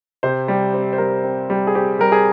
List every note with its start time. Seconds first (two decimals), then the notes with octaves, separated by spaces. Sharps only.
0.23 C3 C5
0.48 G3
0.74 C4
0.93 C5
0.98 G3 A#4
1.24 C4
1.50 G3
1.67 G#4
1.75 C4 G4
1.99 G3 A#4
2.12 G#4